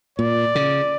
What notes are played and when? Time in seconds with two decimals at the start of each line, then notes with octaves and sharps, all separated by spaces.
0.19 A#2 D5
0.55 C#3